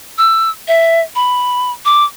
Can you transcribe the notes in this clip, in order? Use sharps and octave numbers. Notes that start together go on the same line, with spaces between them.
E6
E5
B5
D6